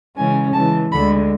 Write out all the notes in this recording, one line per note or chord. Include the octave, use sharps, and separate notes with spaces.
C#3 E3 G#3 C#4 G#5
C#3 E3 G#3 A5
D2 D3 G#3 B5